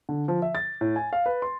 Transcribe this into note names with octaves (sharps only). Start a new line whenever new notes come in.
D3
F3
E5
A6
A2
G#5
F5
B4
C6